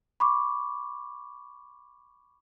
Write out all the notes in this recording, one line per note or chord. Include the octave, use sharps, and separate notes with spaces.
B5 C#6 D6